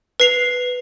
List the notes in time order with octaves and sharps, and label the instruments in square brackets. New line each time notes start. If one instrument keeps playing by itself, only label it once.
[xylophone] B4 C7 F7